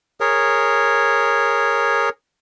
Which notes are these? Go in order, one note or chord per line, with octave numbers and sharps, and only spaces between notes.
G#4 A#4 C#5